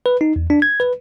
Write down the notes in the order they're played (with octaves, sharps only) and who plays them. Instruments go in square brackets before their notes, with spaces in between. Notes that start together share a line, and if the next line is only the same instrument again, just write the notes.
[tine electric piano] B4
D#4
E2
D4
G#6
B4